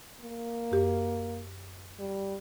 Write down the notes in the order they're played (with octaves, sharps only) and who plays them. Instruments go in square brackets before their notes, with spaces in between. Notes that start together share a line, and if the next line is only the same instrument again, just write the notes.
[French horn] A#3
[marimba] F#2 G4
[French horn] G3